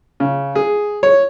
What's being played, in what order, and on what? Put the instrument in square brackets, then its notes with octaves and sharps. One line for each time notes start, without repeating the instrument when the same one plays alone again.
[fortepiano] C#3
G#4
C#5